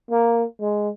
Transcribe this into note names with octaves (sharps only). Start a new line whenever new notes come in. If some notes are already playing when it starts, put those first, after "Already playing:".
A#3
G#3